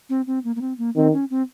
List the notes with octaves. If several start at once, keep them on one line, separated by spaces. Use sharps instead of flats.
C4
C4
A#3
A#3
C4
A#3
D#3 C4
C#4
C4